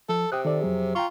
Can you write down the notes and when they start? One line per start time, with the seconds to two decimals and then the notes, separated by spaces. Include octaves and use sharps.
0.09 F3 A4
0.32 C3 G5 D#6 F#6
0.45 D#3 A4 D5
0.61 F2 F#3 G#4
0.95 F4 G5 A#5 C#6